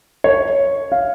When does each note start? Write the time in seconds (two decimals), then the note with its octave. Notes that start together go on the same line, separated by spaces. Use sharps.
0.24 C#5
0.92 F5